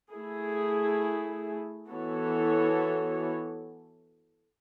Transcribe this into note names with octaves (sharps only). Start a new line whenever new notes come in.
A3 E4 G#4
E3 B3 F#4 A4 C#5